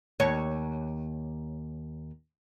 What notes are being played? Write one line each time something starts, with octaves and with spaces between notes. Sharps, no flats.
D#2 C#5